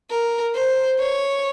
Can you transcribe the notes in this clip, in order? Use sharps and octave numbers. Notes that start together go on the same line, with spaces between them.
A#4
C5
C#5